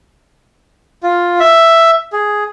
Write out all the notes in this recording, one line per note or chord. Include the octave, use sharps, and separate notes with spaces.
F4
E5
G#4